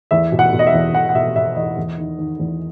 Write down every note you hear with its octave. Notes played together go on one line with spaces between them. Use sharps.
E2 E5
B2
F#5
B2
D#5
E5
E2
E2 F#5
F#5
B2 E5
B2 E5
E2 D#5
E2
D#3
D#3
E2